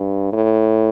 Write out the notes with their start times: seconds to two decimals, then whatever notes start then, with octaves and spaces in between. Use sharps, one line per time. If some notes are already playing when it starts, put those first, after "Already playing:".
Already playing: G2
0.33 A2